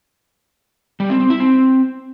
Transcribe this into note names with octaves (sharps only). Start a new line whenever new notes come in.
G3
C4
C4
E4
C4